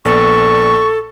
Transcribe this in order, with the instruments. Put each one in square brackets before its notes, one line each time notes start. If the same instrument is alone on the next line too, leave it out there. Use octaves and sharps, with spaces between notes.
[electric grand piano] A#1 B3 D5 [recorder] A4 [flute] C#6